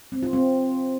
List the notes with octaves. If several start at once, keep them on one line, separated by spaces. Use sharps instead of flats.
C4
F4
C4